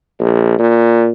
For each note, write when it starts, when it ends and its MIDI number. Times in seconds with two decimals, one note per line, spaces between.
0.20 0.58 34
0.59 1.11 46